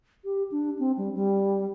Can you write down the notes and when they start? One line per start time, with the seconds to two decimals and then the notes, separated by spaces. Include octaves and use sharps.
0.24 G4
0.51 D4
0.79 C4
0.97 G3
1.15 G3